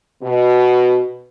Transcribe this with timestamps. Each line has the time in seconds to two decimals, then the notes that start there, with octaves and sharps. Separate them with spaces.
0.22 B2